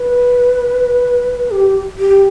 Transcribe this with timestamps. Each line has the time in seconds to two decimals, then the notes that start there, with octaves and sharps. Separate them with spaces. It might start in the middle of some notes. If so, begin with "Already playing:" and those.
Already playing: B4
1.51 G4
1.99 G4